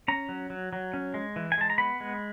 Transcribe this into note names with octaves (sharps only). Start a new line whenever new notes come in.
C#4 A#5
F#3
F#3
F#3
C#4
G#3
E3
G#5
G#3 A5
A#5
B3 B5
G#3